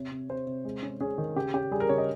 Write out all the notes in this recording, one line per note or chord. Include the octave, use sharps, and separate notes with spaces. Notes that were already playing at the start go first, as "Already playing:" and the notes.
Already playing: C3 C#5
C3
C3 C5
C3
G#3
C#4
C#4 G#4
D#3
C#3 G4
C#4 G4
G3 G#4
A#4
C#3 C#5
D#5